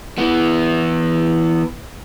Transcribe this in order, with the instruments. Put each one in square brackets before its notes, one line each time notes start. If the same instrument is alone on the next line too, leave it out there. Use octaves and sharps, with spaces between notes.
[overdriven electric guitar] E3 B3